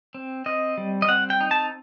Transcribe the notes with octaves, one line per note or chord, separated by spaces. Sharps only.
C4
C4 D#5
G3
D#5
C4 F#5
G5
D#4
A5